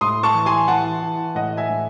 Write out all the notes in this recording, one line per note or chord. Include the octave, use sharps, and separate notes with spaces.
A2 C6 D#6
A5 C#6
E3
G#5 C6
E3 F#5 A5
E3
A2 D#5 F#5
E5 G#5
A2